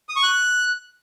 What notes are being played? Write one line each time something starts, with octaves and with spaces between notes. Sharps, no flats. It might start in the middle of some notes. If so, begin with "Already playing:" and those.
D#6
C#6
F#6